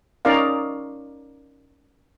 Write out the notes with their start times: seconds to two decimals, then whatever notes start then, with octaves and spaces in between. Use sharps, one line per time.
0.25 C#4 D#4 A#4 D5 F5